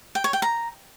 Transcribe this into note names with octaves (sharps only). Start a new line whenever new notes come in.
G5
C#5
G5
A#5